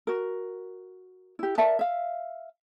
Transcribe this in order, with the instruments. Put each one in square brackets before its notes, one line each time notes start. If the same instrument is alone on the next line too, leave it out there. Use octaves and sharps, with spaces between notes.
[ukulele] F#4 A#4
E4 G4
A#4 D5 E5 A5
E5 F5